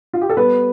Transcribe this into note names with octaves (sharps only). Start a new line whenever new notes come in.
F4
G4
A4
G3 B3 B4